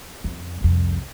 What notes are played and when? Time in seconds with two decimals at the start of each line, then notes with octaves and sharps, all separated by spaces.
0.24 F2
0.61 C2 F2